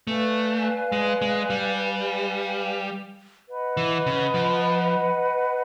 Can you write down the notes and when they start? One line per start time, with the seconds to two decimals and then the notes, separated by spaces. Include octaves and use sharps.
0.07 A3 B4 D5 F5 G#5
0.92 G#3
1.22 G#3
1.50 G3
3.50 B4 D#5 F#5 B5
3.77 E3
4.06 C#3
4.34 F3